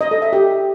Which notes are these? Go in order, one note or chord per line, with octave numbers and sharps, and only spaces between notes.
D#5
A4
E5
G4